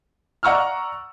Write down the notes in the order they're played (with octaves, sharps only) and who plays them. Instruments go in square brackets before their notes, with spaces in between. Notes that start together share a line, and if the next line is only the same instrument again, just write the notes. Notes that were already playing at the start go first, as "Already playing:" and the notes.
[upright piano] D5 F#5 A#5 C#6 E6 F6